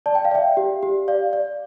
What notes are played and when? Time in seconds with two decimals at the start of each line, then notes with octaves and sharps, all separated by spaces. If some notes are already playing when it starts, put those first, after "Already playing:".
0.06 D5 A5
0.15 G5
0.25 F5
0.31 D5 E5 G5
0.57 G4
0.83 G4
1.08 D5 F5
1.33 D5